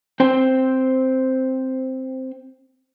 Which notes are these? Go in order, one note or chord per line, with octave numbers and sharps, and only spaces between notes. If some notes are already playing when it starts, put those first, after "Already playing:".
C4 C5 G5